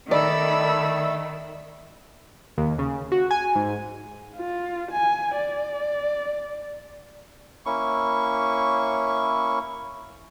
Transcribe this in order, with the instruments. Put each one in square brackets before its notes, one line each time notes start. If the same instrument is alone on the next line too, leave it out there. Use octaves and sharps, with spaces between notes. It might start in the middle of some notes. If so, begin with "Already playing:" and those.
[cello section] D#3 [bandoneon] A3 A4 [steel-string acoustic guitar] D5 [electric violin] B5 E6
[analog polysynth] D#2
C#3
F#4
G#5
G#2
[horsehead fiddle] F4
G#5
D5
[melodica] A#3 C#4 E4 C#6